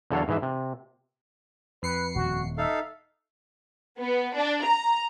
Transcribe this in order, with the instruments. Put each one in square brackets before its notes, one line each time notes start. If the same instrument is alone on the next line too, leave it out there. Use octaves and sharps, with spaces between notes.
[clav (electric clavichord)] E2 D3 F#3 A4 C#5 F5
G#2 E3 G#4 E5
C3
[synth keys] F2 C7 C#7 [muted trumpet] B4
[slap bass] D#1 [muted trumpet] F#4
[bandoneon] D#4 A4 F5 [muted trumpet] E5
[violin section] B3
D4
A#5